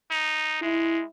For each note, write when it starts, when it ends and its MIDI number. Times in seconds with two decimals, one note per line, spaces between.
0.11 0.60 63
0.62 1.02 56
0.62 1.04 64